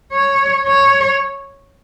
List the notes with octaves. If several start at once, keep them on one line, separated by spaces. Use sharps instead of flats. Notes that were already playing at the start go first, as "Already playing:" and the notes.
C#5
C#5